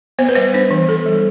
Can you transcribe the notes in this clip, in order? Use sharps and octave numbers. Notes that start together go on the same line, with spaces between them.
B3 C5
B4
G3 C5
D4 C5
E3
B3 A4
G3